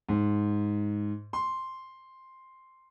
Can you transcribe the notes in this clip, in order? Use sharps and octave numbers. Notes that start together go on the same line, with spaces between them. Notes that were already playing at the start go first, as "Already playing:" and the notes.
G#2
C6